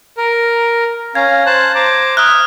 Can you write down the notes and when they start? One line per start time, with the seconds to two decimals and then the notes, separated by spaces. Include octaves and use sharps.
0.17 A#4
1.15 C#4 F5 A#5 G#6
1.46 C5 A5 F#6
1.75 C5 A#5 D6
2.17 E5 D#6 F6 F#6